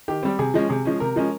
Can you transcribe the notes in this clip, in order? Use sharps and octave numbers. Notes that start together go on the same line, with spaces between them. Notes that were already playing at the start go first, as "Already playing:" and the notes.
D#3 G4
G3 C4
C3 G#4
F3 G#3 C#4
C3 G#4
F3 G#3 C#4
C3 A#4
F3 G#3 C#4